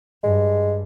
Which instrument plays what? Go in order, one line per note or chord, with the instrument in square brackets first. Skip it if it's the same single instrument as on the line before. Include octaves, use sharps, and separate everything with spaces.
[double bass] G2 [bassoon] G#3